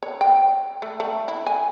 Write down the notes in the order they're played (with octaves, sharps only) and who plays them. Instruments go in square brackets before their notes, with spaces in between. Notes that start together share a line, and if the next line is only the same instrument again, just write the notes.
[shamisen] C#5
G5
A3
A3
E4
G#5